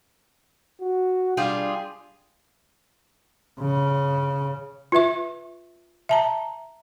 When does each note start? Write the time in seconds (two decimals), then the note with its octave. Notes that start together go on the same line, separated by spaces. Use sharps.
0.81 F#4
1.37 G3 D4 F4 G#4
3.61 C#3
4.92 F4 B4 E5 C#6
6.09 E5 A5 A#5